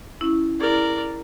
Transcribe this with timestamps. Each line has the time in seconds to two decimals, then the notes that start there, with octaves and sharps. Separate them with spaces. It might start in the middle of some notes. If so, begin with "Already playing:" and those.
0.21 C#4 E4
0.61 E4 G#4 A#4 D5